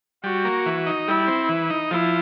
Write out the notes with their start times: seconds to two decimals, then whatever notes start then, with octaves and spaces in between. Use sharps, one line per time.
0.24 G3 F#4
0.45 A#3
0.66 E3
0.86 D#4
1.07 G3 E4
1.27 C4
1.49 E3
1.70 D#4
1.91 F3 E4